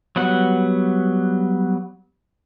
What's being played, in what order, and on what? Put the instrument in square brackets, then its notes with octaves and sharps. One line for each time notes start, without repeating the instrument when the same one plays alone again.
[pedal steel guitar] F#3 G3 B3 F#5